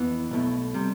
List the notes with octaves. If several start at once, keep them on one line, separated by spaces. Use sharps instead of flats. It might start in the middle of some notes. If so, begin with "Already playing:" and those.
Already playing: F2 E3 B3
B1 B2 A3
C3 G3